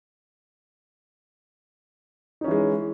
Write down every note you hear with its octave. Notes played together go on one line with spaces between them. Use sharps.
E3 G#3 C#4 D#4